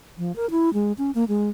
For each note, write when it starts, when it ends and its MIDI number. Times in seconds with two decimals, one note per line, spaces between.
0.18 0.35 53
0.36 0.50 70
0.51 0.73 64
0.74 0.92 56
0.98 1.11 61
1.15 1.25 58
1.28 1.49 56